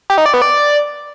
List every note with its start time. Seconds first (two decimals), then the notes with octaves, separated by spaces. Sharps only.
0.10 G4
0.18 D#4
0.26 D5
0.34 B3
0.42 D5